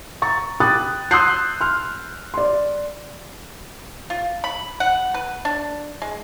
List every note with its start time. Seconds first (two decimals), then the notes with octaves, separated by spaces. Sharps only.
0.22 A#5 C#6 A6
0.60 G5 B5 D6 D#6 F#6 A6
1.11 C6 D#6 E6 F#6 G6 C7
1.61 C6 F6
2.34 D5 C6
4.10 F4
4.44 B5
4.80 F#5
5.14 B4
5.45 D4
6.02 G#3